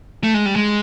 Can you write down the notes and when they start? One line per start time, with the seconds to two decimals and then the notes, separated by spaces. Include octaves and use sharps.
0.24 A3
0.34 G#3
0.46 G3
0.56 G#3